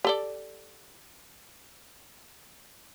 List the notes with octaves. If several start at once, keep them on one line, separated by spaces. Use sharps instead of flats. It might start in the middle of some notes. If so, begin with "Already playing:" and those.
G4 A4 D5